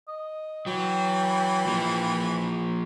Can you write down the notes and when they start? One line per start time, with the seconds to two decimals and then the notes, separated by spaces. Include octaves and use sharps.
0.08 D#5
0.66 E3 F#3 G5
1.67 F3 A#3